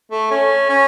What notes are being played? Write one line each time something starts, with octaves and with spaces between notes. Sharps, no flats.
A3
C#4
C#4